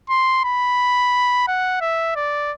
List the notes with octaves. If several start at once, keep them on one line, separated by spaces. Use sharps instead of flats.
C6
B5
F#5
E5
D5